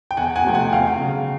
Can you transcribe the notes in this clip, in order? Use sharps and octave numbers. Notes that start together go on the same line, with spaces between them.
G5
E2 F#5 G#5
F#5 G#5
C3 F3 A3 G5
F#5 G#5
E2 F5 G5
C#3 F#3